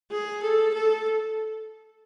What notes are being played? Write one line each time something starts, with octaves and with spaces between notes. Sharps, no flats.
G#4
A4
A4